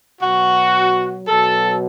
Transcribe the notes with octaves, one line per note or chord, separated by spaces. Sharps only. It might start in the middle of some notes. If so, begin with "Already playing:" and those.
B2 F#3 F#4
B2 F#3 A4